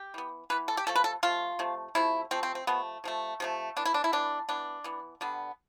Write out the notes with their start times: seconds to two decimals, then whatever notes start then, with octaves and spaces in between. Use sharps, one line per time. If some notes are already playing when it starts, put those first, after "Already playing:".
Already playing: G4
0.14 E3 B3
0.50 E3 B3 B4
0.68 A4
0.77 G4
0.86 C3 F3 A3 A4
0.96 B4
1.04 A4
1.23 C3 F3 A3 F4
1.59 C3 F3 A3
1.95 C3 F3 A3 E4
2.31 C3 F3 A3 C4
2.43 C4
2.55 C4
2.67 C3 F3 A3 B3
3.04 C3 F3 A3
3.40 C3 F3 A3
3.76 E3 B3 D4
3.86 E4
3.94 D4
4.04 E4
4.12 E3 B3 D4
4.49 E3 B3 D4
4.84 E3 B3
5.21 D3 G3 B3